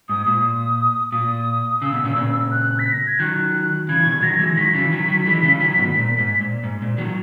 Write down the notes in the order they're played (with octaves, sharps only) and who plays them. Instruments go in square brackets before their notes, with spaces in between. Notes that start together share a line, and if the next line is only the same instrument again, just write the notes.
[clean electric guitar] G#2 [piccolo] D#6
[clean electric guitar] A#2 [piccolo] D#6
[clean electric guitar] A#2 [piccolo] D#6
[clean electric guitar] C#3 [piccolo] E6
[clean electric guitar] B2
A#2 C#3
A#2 C#3
[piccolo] F#6
B6
A#6
G#6
[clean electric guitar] D#3 F#3 [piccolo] F#6
[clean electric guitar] C#3 E3 [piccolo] G#6
[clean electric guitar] B2 D#3
[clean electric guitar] D#3 F#3 [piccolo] A#6
[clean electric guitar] E3 G#3 [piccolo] G#6
[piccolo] A#6
[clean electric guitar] D#3 F#3 [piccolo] B6
[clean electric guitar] C#3 E3
D#3 F#3
D#3 F#3
E3 G#3
C#3 E3
D#3 F#3
G#2 B2
A#2
G#2
A#2
G#2
A#2
D#3 F#3